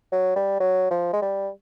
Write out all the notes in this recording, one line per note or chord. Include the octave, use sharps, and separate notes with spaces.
F#3
G3
F#3
F3
G#3
G3